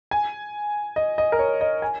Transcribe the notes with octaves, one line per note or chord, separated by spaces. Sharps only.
G#5
D#5
D#5
A#4
C#5
D#5
G#5